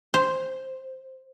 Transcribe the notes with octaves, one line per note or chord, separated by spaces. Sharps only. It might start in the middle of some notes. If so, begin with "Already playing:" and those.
C5